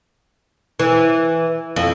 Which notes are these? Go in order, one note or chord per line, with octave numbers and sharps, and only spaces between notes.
E3
F2